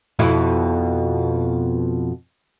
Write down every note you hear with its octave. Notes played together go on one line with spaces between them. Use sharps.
F2 B2 E4